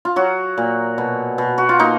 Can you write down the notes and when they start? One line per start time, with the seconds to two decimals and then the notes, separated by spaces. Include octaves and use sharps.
0.05 F4
0.16 F#3 F#4
0.58 A#2
0.98 B2
1.38 B2
1.58 F#4
1.69 F4
1.79 A#3 D#4